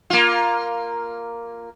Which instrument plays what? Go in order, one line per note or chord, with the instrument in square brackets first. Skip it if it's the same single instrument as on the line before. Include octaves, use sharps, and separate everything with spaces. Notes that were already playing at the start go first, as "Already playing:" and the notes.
[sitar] A#3 F4